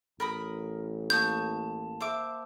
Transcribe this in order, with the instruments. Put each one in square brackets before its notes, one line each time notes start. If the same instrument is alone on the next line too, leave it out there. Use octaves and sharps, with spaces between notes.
[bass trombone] A1 [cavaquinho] A#4 B5 D#6
[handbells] A#3 A5 [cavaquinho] C#6 D#6 [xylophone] G6
[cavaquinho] C5 E5 D6